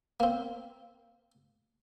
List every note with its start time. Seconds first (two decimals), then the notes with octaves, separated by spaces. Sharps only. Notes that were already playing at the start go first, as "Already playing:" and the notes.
0.20 A#3 C4